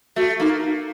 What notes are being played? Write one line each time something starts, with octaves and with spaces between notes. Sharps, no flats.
A3 F#4
A#3 D#4